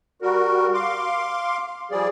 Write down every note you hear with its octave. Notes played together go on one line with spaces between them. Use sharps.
G3 F#4 A#4
F5 C6 D6
F3 G3 G#4 D5